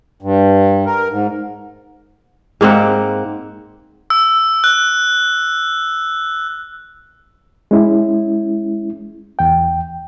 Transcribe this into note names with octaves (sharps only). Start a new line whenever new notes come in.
G2
A#4
G#2
G#2 A#3 C4 F#5
E6
F#6
G#3 C#4 E4
E2 G5